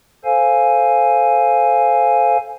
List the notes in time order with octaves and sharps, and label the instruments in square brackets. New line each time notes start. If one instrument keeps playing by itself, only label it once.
[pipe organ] A4 C5 F5 G#5